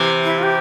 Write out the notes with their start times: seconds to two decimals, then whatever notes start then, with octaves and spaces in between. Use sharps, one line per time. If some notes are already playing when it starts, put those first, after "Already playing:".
Already playing: C3 E3
0.24 E4
0.38 F4
0.43 G4